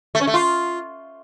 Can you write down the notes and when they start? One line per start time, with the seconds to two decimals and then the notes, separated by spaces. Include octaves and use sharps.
0.15 A3
0.21 C#4
0.27 A3
0.34 F4